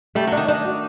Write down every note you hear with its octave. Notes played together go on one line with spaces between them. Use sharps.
G3 A3
F#3
D#3 D4
D#3 D4
F#4